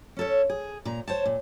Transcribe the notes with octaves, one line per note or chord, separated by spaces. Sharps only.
C#4 A4 C#5
G#4
A#2 A#5
C5 C#5 A5
A#2